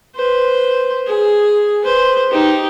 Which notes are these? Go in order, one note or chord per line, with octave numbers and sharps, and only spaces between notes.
B4 C5
G#4
B4 C5
D#4 G4